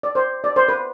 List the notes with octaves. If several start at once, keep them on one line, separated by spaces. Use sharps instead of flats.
D5
C5
D5
C5
B4